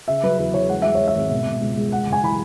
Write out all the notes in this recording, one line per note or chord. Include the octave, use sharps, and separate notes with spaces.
C#3 E5
F#3 B4
E2 B4
E2 C#5
G#3 F#5
G#3 E5
G#3 C#5
E5
G#1
B2
B2
C#2
G#3
G#3 F#5
F#1
G#5
E3 B5